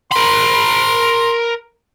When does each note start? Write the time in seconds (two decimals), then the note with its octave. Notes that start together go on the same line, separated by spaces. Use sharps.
0.12 A#4 B5 C6